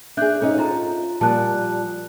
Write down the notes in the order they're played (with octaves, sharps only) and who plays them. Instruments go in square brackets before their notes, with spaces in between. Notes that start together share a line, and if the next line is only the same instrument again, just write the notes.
[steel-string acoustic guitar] D4 G#4 [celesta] E5 F#6 G6
[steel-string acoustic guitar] G#2 C#4 D#4 [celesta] A4
[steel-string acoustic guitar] F4 A5 [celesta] C5 A#5
[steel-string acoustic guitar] A#2 F3 G3 [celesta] A5 F#6